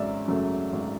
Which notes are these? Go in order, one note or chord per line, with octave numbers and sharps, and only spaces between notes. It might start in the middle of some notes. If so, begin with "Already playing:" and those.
Already playing: G#1 F#2 C#3 F#3 D5 E5
F#2 C#3 F#3 A3
G#1